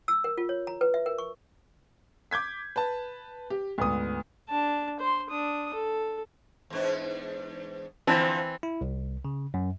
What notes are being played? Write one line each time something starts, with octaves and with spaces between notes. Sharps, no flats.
E6
A#4
F4
C#5
A#5
B4
E5
A#4
C#6
D6 G6 G#6 B6
B4 A5
G4
D2 G#2 B3 D#6
D4 A5
C5 C6
D4 D#6
A4
E2 G#2 D4
D3 E3 F3 C4 A5
E4
C2
C#3
F#2